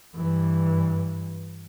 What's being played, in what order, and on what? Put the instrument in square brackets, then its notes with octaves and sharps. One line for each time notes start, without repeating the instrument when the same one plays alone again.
[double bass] G2 E3